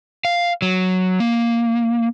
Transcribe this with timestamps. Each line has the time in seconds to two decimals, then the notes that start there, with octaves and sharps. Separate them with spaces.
0.25 F5
0.62 F#3
1.20 A#3